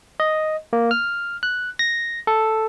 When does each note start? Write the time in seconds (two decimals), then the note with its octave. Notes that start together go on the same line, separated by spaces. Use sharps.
0.20 D#5
0.73 A#3
0.91 F6
1.43 F#6
1.79 A#6
2.27 A4